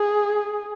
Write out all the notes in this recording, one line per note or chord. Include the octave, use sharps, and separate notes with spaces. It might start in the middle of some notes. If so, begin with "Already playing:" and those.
Already playing: G#4